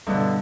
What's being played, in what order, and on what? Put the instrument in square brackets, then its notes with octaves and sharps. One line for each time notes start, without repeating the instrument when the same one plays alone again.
[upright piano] G2 [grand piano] B2 D3